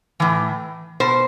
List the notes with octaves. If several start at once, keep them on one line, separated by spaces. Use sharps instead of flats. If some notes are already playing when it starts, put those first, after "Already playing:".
A2 E3
B2 C5